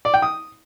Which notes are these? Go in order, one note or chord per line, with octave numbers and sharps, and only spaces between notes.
D5
G5
D#6